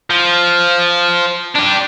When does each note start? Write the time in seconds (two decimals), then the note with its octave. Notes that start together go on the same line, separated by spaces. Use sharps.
0.10 F3
1.56 D4 G4